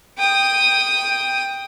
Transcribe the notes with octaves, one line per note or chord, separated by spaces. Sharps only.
G5 D#6